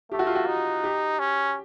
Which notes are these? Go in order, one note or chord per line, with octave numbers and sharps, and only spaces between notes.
A3 G4
F#4
F4
F#4
D#4
G4
C#4